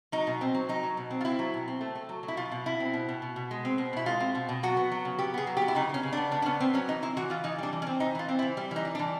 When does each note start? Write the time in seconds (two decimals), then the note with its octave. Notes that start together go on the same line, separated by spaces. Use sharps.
0.12 F#3 D#4
0.27 B2
0.41 C4
0.54 F#3
0.69 F#3 D#4
0.83 F#3
0.97 B2
1.10 C4
1.21 F4
1.25 C4 E4
1.39 F#3
1.54 B2
1.68 C4
1.81 A3
1.95 A3
2.09 F#3
2.23 F#3
2.28 E4
2.37 B2 F4
2.52 B2
2.66 B2 E4
2.80 C4
2.93 B2
3.09 B2
3.22 B2
3.36 B2
3.51 G#3
3.65 C4
3.78 B2
3.93 B2 E4
4.06 G#3 F4
4.20 C4
4.35 B2
4.49 B2
4.63 F#3 F#4
4.77 B3
4.92 F#3
5.05 C#3
5.19 B3 G4
5.34 B3 G#4
5.47 F#3
5.57 G4
5.62 B3
5.68 E4
5.75 C#3 D#4
5.89 C#3 C#4
6.03 C#3
6.12 D4
6.17 B3
6.31 C#3 D4
6.42 D4
6.46 B3 C#4
6.60 B3 C4
6.73 F#3 C#4
6.88 E3 D#4
7.02 C4 E4
7.17 E3 F#4
7.30 E3 F4
7.44 E3 D#4
7.58 G3 D4
7.73 E3
7.82 C#4
7.87 C4
8.00 E3 D#4
8.15 E3 F4
8.29 C4
8.39 E4
8.42 E3
8.57 G3
8.71 E3 D#4
8.85 G3
8.95 D4
8.99 E3